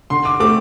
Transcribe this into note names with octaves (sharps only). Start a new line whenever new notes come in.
D3 C6
D6
A3 C4 D6